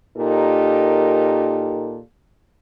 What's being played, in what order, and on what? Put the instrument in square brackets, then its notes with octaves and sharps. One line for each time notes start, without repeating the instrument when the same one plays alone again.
[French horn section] A#2 D#4 G4 A4 A#4